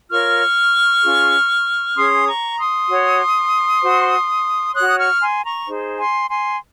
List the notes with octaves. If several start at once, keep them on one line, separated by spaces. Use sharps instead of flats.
F4 A#4 C#5 C#6 F6
C#4 F4 G#4
C#4 G#4 C#5 C6 D#6
A#5 C#6
C6 D#6
F#4 C#5
F#4 C5
F#4 C#5 D#6 F#6
D#6
C#6 F6
G#5 C6
A#5 C#6
D#4 G#4 C5
G#5 C6
G#5 C6